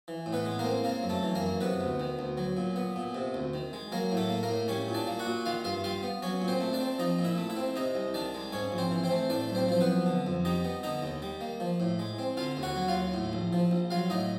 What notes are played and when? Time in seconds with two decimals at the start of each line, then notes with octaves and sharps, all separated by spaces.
0.08 E3
0.26 A2
0.33 B3 B4
0.46 G#3
0.59 A#3 A#4
0.65 C4
0.84 C#3 A#3 A#4
1.03 F#2
1.09 A3 A4
1.23 E3
1.35 A#3 A#4
1.42 F#2
1.61 C3 B3 B4
1.81 D2
2.00 D#3
2.19 D2
2.37 F#3
2.57 A#2
2.76 B3
2.96 A#2
3.15 C3
3.34 D2
3.54 D#3
3.73 G#3
3.92 F#3 A#3 A#4
4.12 A2
4.17 A3 A4
4.30 A#3
4.43 A#3 A#4
4.49 A2
4.68 G3 C#4 C#5
4.88 A#2
4.94 D4 D5
5.07 A#3
5.19 F#4 F#5
5.27 A#2
5.46 D#3 F4 F5
5.64 G2 F4 F5
5.84 G3 F4 F5
6.03 B3
6.22 F#3 C#4 C#5
6.42 A#2
6.48 C4 C5
6.60 A3
6.73 D4 D5
6.81 C4
6.99 F3 D#4 D#5
7.19 A#2
7.24 E4 E5
7.38 A3
7.50 E4 E5
7.56 C4
7.76 C3 D#4 D#5
7.95 C2
8.14 D#3 D4 D5
8.34 G#3
8.52 G#2 C#4 C#5
8.72 A#1
8.78 C4 C5
8.91 E3
9.04 C4 C5
9.11 A3
9.30 A2 D4 D5
9.50 B1
9.55 C4 C5
9.69 F3 C5
9.81 B3 B4
9.87 B1
10.06 D3
10.27 F2
10.45 G3 D#4 D#5
10.65 B3
10.83 D3 D#4 D#5
11.02 D#2
11.22 G3
11.41 A#3
11.60 F3
11.80 A2
11.99 G#3
12.19 C4
12.37 D3 F4 F5
12.57 D#2
12.63 F#4 F#5
12.76 F#3
12.88 F4 F5
12.94 D#2
13.14 A2
13.33 A#1
13.53 F3
13.71 A#1
13.90 F#3 F4 F5
14.10 A2 D#4 D#5